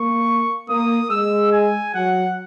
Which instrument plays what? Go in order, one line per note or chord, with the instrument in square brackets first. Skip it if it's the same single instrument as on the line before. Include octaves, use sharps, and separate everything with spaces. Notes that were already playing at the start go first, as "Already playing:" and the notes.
Already playing: [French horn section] A#3 [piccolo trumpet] C#6
[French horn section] A#3 [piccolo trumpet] D#6
[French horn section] G#3 [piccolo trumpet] E6
[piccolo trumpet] G#5
[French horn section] F#3 [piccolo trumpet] F#5